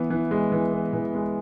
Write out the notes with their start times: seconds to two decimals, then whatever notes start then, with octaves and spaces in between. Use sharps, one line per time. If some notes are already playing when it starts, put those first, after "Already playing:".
Already playing: E3 B3
0.10 E3
0.31 G#3
0.52 E3
0.72 B3
0.93 E3
1.15 G#3